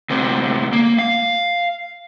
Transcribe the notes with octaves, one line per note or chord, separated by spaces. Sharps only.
D2 C3
A#3
F5